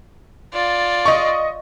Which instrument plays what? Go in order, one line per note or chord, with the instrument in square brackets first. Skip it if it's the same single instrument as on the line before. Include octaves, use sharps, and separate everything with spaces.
[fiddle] F4 D5
[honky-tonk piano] D#5 C#6